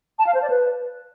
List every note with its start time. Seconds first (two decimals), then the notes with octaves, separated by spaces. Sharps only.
0.19 A5
0.26 F5
0.34 C5
0.42 D5
0.50 B4